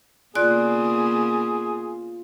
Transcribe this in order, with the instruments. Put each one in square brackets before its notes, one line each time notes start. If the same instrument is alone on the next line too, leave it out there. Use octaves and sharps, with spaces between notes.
[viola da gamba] C#3 A#3 B3 [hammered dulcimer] F4 [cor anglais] G#4 [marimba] D5 F#6